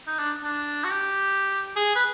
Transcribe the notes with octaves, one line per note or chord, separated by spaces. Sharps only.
D#4
D4
D4
F#4
G4
G#4
B4